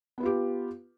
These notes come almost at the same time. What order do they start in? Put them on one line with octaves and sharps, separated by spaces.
B3 B4 F4 G4